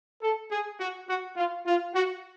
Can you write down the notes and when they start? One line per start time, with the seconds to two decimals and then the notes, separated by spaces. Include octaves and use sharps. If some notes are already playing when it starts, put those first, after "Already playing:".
0.22 A4
0.51 G#4
0.80 F#4
1.08 F#4
1.37 F4
1.66 F4
1.94 F#4